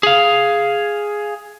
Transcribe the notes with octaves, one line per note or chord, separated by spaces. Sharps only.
G#4 F5